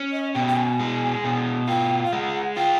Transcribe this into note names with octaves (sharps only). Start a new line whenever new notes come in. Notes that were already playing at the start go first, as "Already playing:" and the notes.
Already playing: C#4
D#5
B2 G5
G5
G#5
G#3
B2
F4 G5
F5
G#3 F#5
F4 G5